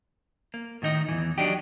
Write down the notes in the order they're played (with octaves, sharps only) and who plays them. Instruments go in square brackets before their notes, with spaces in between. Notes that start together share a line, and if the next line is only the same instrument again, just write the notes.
[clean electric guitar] A#3
A2 D#3 D#4 D#5
E2 G#2 E3
F#3 D4 D#4 G4